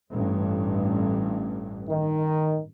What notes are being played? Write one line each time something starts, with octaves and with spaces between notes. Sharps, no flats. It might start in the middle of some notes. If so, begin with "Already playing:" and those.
A1 G2
D#3